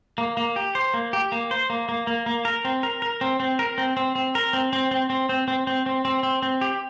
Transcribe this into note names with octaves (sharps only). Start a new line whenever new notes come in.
A#3
A#3
G4
C5
A#3
G4
A#3
C5
A#3
A#3
A#3
A#3
A#4
C4
A#4
A#4
C4
C4
A#4
C4
C4
C4
A#4
C4
C4
C4
C4
C4
C4
C4
C4
C4
C4
C4
G4